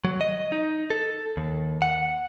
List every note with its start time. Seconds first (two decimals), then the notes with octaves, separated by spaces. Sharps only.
0.05 F#3
0.21 D#5
0.52 D#4
0.90 A4
1.37 D#2
1.82 F#5